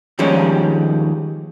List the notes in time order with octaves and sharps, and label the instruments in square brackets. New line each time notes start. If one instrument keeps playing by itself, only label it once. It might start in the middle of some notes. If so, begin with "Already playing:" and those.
[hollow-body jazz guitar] D#2 F3 G3 G#3 C#4